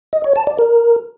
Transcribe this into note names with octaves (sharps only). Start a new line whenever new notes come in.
D#5
C#5
A5
D5
A#4